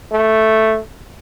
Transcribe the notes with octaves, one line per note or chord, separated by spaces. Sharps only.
A3